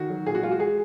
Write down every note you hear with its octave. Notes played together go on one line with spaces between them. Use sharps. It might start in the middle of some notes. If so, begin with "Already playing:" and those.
Already playing: D#3 F#4
F#3
A#2 G#4
F#4
G#3 F4
F#4
G#3 G#4